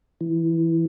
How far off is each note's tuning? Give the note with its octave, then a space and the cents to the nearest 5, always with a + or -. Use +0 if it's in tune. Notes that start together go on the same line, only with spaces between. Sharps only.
E3 +0